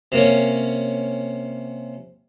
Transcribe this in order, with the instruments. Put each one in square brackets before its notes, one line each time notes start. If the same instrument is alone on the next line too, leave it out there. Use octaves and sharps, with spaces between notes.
[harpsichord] C3 A#3 C#4